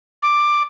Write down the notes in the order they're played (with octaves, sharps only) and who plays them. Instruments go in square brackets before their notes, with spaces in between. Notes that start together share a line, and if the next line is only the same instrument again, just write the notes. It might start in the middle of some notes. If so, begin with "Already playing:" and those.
[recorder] D6